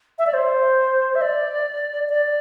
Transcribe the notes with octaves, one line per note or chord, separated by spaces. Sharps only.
E5
D5
C5
E5
D5
D5